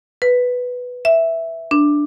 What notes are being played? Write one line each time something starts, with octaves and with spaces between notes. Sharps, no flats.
B4
E5
D4